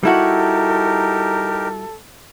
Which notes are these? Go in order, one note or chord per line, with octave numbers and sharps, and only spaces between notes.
G3 D#4 E4 F#4 G4 A4 A#4